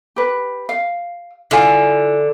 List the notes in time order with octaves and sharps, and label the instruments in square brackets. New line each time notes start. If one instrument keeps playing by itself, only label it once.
[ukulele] G4 B4
F5
[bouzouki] D3 [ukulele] E4 F4 G#5